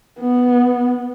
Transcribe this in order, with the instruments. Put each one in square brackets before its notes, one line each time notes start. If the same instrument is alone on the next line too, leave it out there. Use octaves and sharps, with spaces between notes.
[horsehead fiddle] B3